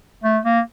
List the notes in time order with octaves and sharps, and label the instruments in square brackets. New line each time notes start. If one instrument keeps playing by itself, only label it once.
[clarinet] A3
A#3